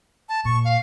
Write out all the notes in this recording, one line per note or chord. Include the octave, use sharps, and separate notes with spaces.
A5
A#2 C#6
F5